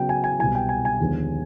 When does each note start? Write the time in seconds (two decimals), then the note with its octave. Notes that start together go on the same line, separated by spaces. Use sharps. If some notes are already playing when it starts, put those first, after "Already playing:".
Already playing: C#3 F#3 B3 G5
0.09 G#5
0.24 G#5
0.40 C2 B2 F#3 G#5
0.55 G5
0.69 G#5
0.85 G#5
1.00 D#2 D3 F3 G#3 B3